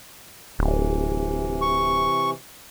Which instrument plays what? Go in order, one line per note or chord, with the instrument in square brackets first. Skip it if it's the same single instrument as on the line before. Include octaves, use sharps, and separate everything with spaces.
[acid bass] D1 [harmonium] C3 E3
[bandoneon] C#6